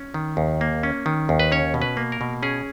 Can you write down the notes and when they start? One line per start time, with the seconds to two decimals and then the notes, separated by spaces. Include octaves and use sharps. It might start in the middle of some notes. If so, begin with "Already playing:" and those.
Already playing: C#4
0.14 D#3
0.37 D#2
0.61 A#3
0.83 C#4
1.06 D#3
1.29 D#2
1.40 B4
1.52 C#4 C#5
1.74 B2
1.82 B4
1.97 A#3
2.12 A#4
2.21 B2
2.43 C#4 G#4